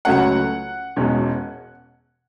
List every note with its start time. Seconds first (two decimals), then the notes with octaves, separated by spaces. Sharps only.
0.05 C#2 C#3 F#3 A3 C#4 F#5
0.96 E1 E2 B2 G#3 C#4